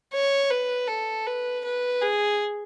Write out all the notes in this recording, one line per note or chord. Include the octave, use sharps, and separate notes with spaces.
C#5
B4
A4
B4
B4
G#4